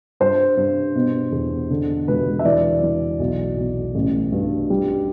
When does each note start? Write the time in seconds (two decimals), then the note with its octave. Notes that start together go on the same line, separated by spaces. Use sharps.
0.20 G2 C5
0.57 G2
0.95 B2
1.32 E2
1.70 D3
2.08 E1 B4
2.39 E5
2.45 E3 D5
2.82 E3
3.19 B1
3.57 B1
3.95 A1
4.32 G2
4.70 G3